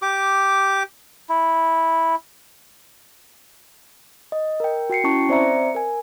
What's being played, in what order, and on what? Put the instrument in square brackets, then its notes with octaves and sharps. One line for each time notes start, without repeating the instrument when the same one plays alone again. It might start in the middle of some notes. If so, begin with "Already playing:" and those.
[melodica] G4 D6
E4
[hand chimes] D#5
A#4 G5
F#4 G5 C7 C#7
C#4 E4 A5 C#6
C4 C5 D5 E5 A#5 C#7
A#4 G#5